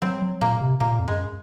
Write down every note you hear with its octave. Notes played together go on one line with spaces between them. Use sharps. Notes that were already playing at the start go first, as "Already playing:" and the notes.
F#3 C4
F#3
A#2 A#3
C3
A#2 A#3
F2
F#2 G#3